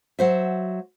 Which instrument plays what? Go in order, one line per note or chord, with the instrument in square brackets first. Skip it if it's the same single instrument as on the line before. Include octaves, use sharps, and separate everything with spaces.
[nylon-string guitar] F#3 C5 E5